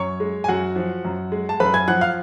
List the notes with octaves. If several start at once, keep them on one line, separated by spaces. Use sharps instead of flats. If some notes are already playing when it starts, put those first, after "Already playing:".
Already playing: F#2 C#5 C#6
G#3
G#5
F#2 F#4 F#5
F3
F#2
G#3
A5
F#2 B4 B5
G#5 G#6
F3 F#5 F#6
F5 F6